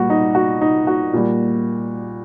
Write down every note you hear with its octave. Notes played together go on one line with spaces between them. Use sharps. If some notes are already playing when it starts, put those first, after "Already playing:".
Already playing: A#2 G3 F#4
D#4
F#4
D#4
F#4
A#2 G3